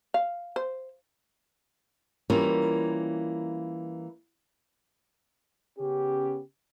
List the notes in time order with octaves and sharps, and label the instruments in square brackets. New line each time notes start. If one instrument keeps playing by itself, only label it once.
[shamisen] F5
C5
[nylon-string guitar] E3 G3 A#3 C#4 F4 A#4
[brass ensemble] C#3 B3 C#4 G4